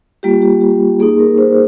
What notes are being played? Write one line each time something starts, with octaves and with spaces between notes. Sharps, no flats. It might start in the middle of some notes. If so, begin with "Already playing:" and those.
G3 A#3 F4 G4
G4
G4
A#3 D#4 G#4
A#4
C5